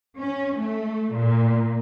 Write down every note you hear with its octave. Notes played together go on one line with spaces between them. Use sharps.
C#4
A3
A#2